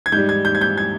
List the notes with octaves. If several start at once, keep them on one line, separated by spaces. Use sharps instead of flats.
G#6
G#2 G3 G6
G#6
G6
G#6
G6
G#6